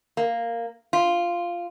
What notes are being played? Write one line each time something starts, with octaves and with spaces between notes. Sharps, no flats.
A#3
F4